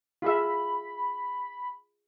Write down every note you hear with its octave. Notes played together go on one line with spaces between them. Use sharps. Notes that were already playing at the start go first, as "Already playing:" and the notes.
F4 G#4 E5 B5